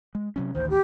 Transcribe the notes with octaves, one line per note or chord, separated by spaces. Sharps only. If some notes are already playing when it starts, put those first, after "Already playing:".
G#3
C3 F#3 C#4
A1 D2 D#3 C5
G4